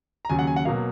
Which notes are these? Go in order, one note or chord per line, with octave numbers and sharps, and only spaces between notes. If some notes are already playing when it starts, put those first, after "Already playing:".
A#5
D#2 C#3 F#3 G#5
F#5
G#5
F#5
B2 F#3 A#3 F5